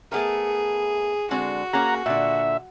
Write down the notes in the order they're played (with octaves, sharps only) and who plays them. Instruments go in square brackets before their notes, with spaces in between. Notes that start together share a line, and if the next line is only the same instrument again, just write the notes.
[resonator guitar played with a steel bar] A3 B3 A#4 [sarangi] G#4
[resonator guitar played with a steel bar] D3 G#3 C4 [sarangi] F#4
[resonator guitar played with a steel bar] A#3 C#4 G#4 [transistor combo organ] F#5 A#5
[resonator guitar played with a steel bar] A#2 D3 [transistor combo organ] E5